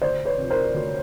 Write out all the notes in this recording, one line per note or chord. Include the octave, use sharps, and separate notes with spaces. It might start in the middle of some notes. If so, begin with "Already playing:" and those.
D2 C5 D5
B4 C#5
C3 F3
A#4 C5
D2